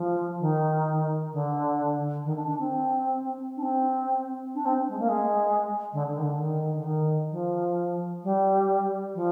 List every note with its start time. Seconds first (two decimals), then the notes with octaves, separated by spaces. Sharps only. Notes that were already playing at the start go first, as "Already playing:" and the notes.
Already playing: F3
0.39 D#3
1.32 D3
2.24 D#3
2.36 D4
2.47 D4
2.59 C4
3.57 D4
3.62 C4
4.55 D4
4.65 C4
4.88 G#3
4.99 A#3
5.09 G#3
5.93 D3
6.08 D3
6.17 D#3
6.23 D3
6.39 D#3
6.76 D3
6.84 D#3
7.31 F3
8.23 G3
9.14 F3